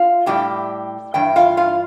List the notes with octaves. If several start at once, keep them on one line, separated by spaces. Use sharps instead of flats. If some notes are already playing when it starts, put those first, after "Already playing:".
Already playing: F4 F5
A2 G3 G4 G5
G2 E3 G5
F4 F5
F4 F5